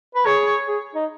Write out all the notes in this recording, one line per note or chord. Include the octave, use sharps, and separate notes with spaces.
B4
G#4 C#5
G#4
D#4